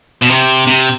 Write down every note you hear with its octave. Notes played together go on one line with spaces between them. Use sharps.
B2
C3
C3